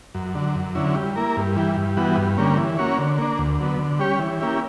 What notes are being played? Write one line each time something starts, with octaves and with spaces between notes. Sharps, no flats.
F#2
D3 F#3
F#2
D3 F#3 C#4 E4
G3
A#3 E4 A#4
G2
E3 G3
G2
E3 G3 B3 F#4
G2
D3 G3 A#3 C#4
E3
A#3 C#4 F#4 C#5
D3
A#3 D4
D2
D3 F#3 B3
D3
G3 C#4 G4 C#5
E3
A#3 C#4 E4 G4